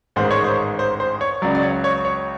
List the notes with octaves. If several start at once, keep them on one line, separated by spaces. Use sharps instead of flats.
A1 G#2 D#3 G#3 C5
C#5
C5
C5
C5
C#5
C#2 C#3 F#3 D5
D5
C#5
C#5
C#5